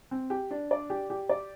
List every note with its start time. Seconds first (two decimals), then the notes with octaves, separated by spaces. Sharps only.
0.11 C4
0.30 G4
0.51 D4
0.71 D5
0.90 G4
1.10 G4
1.29 D5